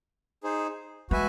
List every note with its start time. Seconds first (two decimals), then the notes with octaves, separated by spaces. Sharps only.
0.43 D#4 G#4 C5
1.11 G#3 F#4 B4 E5 G#5